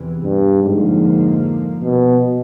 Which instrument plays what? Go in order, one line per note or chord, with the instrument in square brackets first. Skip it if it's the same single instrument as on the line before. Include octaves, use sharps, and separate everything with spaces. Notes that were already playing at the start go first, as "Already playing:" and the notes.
Already playing: [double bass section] E2 C3 E3
[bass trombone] G2
[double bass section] F2 D3 F3 A#3 [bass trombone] G#2
[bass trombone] B2